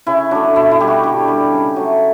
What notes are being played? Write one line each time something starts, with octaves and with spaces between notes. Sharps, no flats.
C#3 E4
F#3 A3 D4
B2 E4
E4
G3 G4
F#4
D3 G4
G3
C#3
F#3 A3